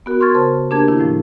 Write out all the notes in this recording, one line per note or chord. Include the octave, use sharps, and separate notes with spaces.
B3 F#4 A#4
A#4 C6 C#6 F6 G#6 A6
C#3 A#4 C5 A5
A#3 D4 G4 A#4 A5 G#6
D#3 E4
A2 F3